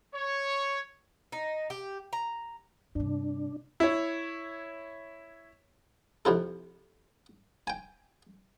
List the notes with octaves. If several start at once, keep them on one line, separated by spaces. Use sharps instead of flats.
C#5
D#4
G4
A#5
G2 C3 D4
E4 C#5
F2 C3 E4 A4
G5 G#5